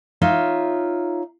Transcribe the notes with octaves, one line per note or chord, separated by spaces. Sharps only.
D#4 F4 C#5 E5